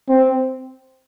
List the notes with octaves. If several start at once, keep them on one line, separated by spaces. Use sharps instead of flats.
C4